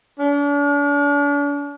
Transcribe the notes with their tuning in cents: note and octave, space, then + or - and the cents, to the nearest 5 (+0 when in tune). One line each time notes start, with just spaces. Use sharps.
D4 -40